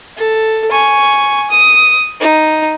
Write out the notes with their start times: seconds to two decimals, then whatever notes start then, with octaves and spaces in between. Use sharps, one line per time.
0.17 A4
0.72 G#5 C#6
1.50 D#6
2.20 D#4